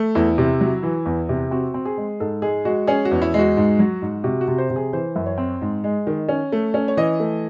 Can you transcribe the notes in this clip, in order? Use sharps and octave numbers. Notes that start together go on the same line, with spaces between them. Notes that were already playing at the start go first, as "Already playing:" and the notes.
Already playing: A3
E2 E4
C3
F#3
E3
E2
C3
C4 F#4
C4
G#4
G#3
G#2 A4
G#3 G#4
G#3 F#4
C#4 G#4
F#4
E2
E4
G#3 F#4
G#2
F#3
G#2
C3 F#4
F#4
C3
C5
C3
G#4
E3 C5
F#2
C#5
C4
G#2
G#3
D#3
C#4
A3
C#4
C#5
E3 D#5
A3